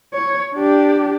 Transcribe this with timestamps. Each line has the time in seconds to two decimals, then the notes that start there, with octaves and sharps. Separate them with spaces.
0.14 C#5
0.55 D4 G4